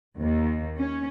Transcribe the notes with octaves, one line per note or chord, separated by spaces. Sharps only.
D#2
C#4